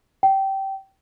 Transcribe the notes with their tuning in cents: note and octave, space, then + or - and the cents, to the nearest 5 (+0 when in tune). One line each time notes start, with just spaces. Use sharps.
G5 -20